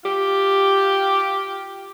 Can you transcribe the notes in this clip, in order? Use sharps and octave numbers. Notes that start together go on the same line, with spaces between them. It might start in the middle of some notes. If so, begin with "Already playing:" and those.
F4 G4